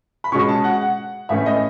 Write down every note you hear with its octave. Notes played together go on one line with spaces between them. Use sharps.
B5
B2 G#3 C#4 C#6
A5
F#5
F#5
A2 E3 A3 C#4 E5
D#5